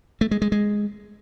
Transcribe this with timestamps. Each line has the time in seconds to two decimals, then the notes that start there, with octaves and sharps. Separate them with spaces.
0.21 A3
0.31 G#3
0.42 G#3
0.52 G#3